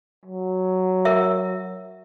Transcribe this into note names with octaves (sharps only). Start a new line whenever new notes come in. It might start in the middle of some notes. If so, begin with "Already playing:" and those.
F#3
A#4 E5